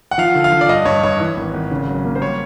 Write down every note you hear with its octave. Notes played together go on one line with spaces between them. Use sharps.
F#5
F3 F5
D3
F5
F3
D5
G2 D#5
G2 C#5
G2 C#5
E3
G#1
G#1
C#3
F#3
A#3
C5
G3 C#5